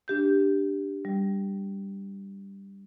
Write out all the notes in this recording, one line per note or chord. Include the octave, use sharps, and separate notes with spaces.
D4 G4 G6
G3